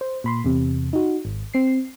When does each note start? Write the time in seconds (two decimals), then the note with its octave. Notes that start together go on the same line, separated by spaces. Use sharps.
0.01 C5
0.24 A#2 B5 C6
0.44 E2 C3
0.93 D#4 F#4
1.25 G#1
1.54 C4 C7